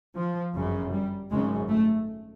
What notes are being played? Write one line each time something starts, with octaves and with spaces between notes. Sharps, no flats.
F3
G1 F#2 C#3
G3
G#1 F#2 C#3 G#3
A3